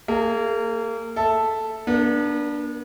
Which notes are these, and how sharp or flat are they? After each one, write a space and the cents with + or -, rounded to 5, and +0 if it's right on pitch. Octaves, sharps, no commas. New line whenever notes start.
A#3 -30 G#4 +0
A4 +0 E5 +0
B3 -40 D4 +0 A#4 +0